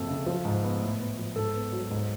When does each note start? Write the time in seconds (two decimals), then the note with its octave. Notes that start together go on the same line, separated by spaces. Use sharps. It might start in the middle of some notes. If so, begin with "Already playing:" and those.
Already playing: F#1 F2 A4
0.09 C#3
0.26 F3
0.45 G#2
0.63 B3
0.82 A2
1.00 B3
1.18 F3
1.36 G#2 A4
1.54 B3
1.72 F#3
1.91 G#2